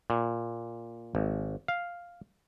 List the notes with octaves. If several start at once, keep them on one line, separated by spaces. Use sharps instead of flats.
A#2
G#1
F5